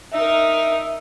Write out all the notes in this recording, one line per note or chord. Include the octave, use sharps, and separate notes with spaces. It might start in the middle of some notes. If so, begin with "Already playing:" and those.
D#4 A#4 E5